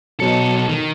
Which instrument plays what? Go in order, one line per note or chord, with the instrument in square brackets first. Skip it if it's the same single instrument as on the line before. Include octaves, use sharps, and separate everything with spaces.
[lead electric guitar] B1 A4 [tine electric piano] B2 F#3 C#7
[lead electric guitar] D#3